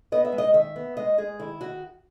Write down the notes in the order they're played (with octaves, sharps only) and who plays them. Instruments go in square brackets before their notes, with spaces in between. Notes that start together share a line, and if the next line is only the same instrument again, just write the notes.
[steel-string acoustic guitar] B3 D#5
E5
G#3
D#5
D#3 E5
B3
G#3 D#5
G#3 G#4
D#3 E4
D#3 F#4